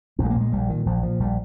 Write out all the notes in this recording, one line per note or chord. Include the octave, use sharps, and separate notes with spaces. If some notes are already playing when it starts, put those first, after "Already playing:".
A#1 C4
G#3
A#3
A#2
G#3
A#1 G3
A#2 D#3
A#1 F3
A#2 F3
A#1 G3